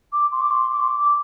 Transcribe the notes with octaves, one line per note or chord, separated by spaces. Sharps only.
D6
C6
D6
C6
D6
C6
D6